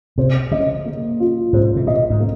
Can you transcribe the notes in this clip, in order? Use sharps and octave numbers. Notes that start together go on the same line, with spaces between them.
C3 C5
C#3 D#5
A#3
F4
G#2 C5
C3
A#2 D#5
G#2
A#3